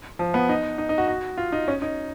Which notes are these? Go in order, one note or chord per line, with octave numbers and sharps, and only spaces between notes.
F3
B3
D#4
D#4
D#4
F#4
F#4
F4
D#4
C#4
D#4